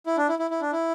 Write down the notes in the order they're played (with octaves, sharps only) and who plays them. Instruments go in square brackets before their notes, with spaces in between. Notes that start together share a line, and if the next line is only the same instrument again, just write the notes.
[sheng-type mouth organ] E4
D4
E4
E4
E4
D4
E4